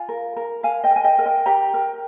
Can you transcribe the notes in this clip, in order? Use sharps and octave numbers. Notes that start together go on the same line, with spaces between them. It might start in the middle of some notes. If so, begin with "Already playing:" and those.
Already playing: F4 F5 G#5
A#4
A#4
A#4 F5 G#5
D#5 G5
A#4
G#5
D#5 G5
A#4
D#5 G5
G4 G5 A#5
A#4